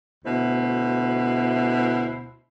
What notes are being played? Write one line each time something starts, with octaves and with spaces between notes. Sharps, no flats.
D2 B2 E4 C5